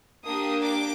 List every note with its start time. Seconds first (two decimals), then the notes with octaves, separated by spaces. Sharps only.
0.24 A#3 D4 G4 D#6
0.64 D6